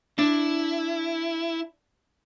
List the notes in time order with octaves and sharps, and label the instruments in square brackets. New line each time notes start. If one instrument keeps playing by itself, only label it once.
[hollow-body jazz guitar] D4 [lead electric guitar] E4